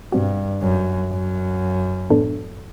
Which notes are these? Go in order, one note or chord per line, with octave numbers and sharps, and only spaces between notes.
G2 B2 G3 C4 F#4
F#2
F#2
A2 E3 B3 D4 A4